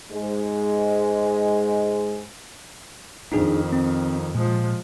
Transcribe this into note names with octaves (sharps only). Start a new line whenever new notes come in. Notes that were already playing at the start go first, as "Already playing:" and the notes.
G#2 G#3
F2 D#3 D4 D#4 G#4
C4
A#2 F3 G#3